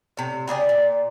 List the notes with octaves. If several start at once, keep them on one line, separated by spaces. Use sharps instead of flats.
A2 C3
C#3 G#4 D5 G5
A#2